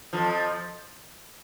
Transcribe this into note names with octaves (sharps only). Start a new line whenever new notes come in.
F2 F3